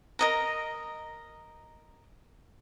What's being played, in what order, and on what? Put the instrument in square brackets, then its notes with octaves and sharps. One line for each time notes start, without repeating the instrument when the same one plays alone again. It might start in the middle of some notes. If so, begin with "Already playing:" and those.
[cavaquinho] A#4 D#5 A#5